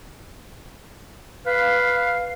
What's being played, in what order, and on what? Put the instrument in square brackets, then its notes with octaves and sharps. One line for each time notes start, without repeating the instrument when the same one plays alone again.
[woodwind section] B4 F5